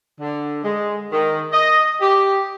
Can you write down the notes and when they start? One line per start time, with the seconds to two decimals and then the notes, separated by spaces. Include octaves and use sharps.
0.20 D3
0.63 G#3
1.11 D#3
1.52 D#5
2.01 G4